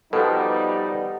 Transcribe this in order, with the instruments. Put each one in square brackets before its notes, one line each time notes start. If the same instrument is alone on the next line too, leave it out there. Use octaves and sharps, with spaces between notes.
[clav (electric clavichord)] B2 F3 [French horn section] G3 [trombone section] D#4 [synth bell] A4 B4 F#5